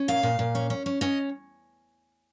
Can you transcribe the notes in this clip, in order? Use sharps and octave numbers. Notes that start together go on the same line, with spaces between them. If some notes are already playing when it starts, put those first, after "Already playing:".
Already playing: C#4
A#2 F5
A#2
A#2
C#4
C#4
C#4
C#4 D#5